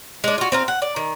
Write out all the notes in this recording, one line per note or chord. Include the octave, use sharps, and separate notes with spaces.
G#3 D4
F4 F#4
C4 F4 A#4
F#5
D5
D#3